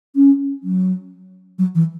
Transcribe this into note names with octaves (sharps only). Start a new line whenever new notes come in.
C#4
F#3
F#3
E3